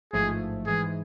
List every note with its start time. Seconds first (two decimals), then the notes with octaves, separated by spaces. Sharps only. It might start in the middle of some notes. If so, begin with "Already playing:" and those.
0.13 A1 G#2 F3 A3 G#4
0.66 G#2 E3 G#3 G#4